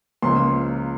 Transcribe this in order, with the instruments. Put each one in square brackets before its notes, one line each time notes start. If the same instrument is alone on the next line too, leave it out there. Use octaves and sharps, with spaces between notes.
[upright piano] C#2 C#3 F3 A#3 C6